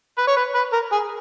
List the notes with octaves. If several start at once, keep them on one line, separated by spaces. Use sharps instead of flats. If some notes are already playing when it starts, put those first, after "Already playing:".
B4
C#5
B4
B4
A#4
G#4